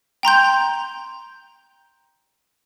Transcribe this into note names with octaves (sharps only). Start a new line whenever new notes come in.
G5 A#5 C6 G6